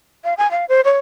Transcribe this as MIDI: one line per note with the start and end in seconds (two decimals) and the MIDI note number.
0.24 0.34 77
0.38 0.50 80
0.51 0.65 77
0.69 0.81 72
0.84 0.99 73